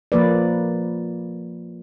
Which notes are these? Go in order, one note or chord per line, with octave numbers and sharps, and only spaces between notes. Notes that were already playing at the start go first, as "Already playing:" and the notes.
F3 A#3 B4 D5